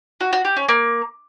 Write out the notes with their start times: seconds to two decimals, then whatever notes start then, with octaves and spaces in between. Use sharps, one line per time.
0.21 F#4
0.33 F#4
0.45 G4
0.57 C#4
0.69 A#3